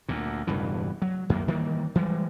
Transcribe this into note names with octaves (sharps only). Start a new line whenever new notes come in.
D2 A#2
E1 G2 C#3 E3
F#3
F#2 D#3 A#3
D#3 E3 G3 A#3
E3 G3 G#3